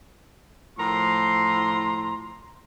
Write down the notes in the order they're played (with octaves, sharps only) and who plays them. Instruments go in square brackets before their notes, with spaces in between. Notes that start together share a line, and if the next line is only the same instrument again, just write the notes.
[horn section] A2 F3 A#5 C6